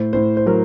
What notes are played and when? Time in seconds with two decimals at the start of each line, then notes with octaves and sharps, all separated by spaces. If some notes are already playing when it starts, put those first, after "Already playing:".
Already playing: A2 C5
0.13 A2 C5
0.37 C5
0.46 F#3 A#4